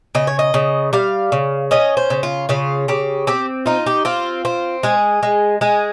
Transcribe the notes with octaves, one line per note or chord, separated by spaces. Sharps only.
C#3 D#5
C#5
D#5
C#3
G3 F5
C#3
C#4 D#5
C5
C#3
F4
C#3 F4
C#3 G4
C4 G4
D#4 F4
G4
C4 F4
C4
G#3 G#4
G#3
G#3 G#4